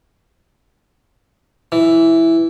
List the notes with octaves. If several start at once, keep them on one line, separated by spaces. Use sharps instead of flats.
E3